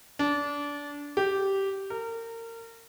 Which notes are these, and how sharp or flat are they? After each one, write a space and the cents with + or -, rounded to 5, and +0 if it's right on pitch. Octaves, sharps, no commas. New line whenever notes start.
D4 -25
G4 -10
A#4 -30